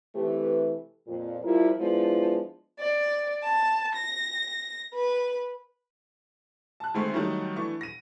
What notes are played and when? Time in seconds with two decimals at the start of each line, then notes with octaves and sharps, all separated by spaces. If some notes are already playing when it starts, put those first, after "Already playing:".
0.15 C3 E3 A3 G4 B4
1.07 F2 A#2
1.44 F3 G3 E4 F4 A#4
1.80 F3 G#3 B3 D4 E4
2.79 D5
3.43 A5
3.95 A#6
4.93 B4
6.80 A5 F#6
6.94 D2 D#3 G#3 A3 C4
7.13 D#3 F#3 G3 A3 D#4
7.56 E3 A3 D4 C#6
7.81 A#6 D#7